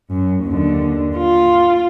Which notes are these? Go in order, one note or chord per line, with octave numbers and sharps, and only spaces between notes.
F#2
D#2 D3
F4